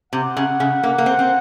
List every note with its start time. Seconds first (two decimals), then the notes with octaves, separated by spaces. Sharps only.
0.13 C3 F#5
0.37 C#3
0.60 C#3
0.83 A#3
0.98 A#3
1.06 C4
1.19 C4